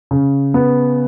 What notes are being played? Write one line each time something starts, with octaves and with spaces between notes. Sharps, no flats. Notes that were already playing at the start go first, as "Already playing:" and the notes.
C#3
B3